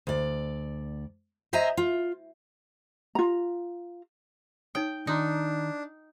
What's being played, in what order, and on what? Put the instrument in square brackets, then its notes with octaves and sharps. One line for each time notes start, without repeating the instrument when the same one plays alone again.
[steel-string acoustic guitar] D2 D5
C5 D#5 E5 G#5 A#5
F4
[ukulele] F4 A#5
[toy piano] D#4 C#5 D#6 [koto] G5
[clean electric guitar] D#3 [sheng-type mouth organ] D4 [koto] D#4 [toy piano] F4 C6 D6